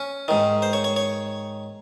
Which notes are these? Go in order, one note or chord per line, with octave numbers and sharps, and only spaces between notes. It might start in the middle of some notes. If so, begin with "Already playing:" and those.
Already playing: C#4
G#2 D#3
C5
C#5
C#5
C#5